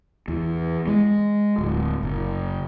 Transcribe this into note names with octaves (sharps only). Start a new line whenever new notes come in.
E2
G#3
D1
F#1